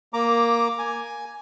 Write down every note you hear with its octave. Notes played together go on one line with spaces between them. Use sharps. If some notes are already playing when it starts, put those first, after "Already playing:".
A#3 A#5 D6
G#5